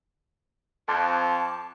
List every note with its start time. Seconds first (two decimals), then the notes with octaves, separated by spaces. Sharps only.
0.89 F2 A5 D6